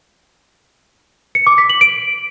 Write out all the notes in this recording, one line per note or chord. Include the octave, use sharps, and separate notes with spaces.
C#7
D6
B6
F#7
D7